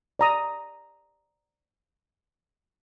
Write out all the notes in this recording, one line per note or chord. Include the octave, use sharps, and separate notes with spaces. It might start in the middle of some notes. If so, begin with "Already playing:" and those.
D5 A#5 D#6